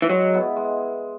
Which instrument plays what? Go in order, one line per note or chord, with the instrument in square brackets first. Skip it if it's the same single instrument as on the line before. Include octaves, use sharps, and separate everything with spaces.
[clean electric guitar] E3
[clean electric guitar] F#3 [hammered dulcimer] G#3
[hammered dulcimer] B3 E4
G#3